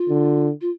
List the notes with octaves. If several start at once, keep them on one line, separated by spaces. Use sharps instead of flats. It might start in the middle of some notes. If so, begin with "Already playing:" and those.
Already playing: F4
D3
F4